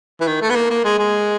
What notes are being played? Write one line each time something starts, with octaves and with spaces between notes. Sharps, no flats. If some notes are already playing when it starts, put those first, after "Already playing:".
E3
D#3
A3
B3
A#3
A#3
G#3
G#3